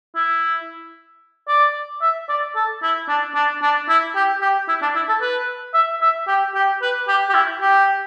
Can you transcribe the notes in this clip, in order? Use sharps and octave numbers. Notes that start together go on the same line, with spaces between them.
E4
D5
E5
D5
A4
E4
D4
D4
D4
E4
G4
G4
E4
D4
E4
A4
B4
E5
E5
G4
G4
B4
G4
G4
E4
G4